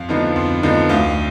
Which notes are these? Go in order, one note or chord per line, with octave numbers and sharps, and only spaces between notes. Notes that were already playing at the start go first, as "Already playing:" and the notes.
Already playing: F2 F5
D3 F3 B3 D#4
F2
D3 F3 B3 D#4
D2 F5